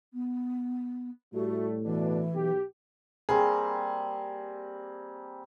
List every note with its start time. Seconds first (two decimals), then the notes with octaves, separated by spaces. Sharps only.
0.13 B3
1.33 A2 G3 A3 F#4
1.84 B2 E3 D4
2.34 B1 G4
3.29 G3 A#3 C4 G#4